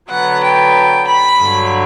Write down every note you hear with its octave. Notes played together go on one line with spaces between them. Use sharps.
D3 F#3 B3 F#5
G5
B5
G2 D3 F#3